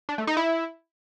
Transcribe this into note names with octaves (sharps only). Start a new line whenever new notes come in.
D4
A3
D#4
E4